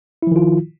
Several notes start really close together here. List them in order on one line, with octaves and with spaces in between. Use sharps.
E4 F3 D#3 F4